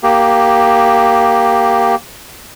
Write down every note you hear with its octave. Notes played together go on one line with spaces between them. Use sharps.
A#3 G4